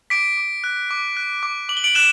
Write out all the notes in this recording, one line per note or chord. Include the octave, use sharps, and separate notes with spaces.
D6 B6 D7
D6
F#6
D6
F#6
D6
D6 F#7
G7
D7 F#7
F#6 E7 G7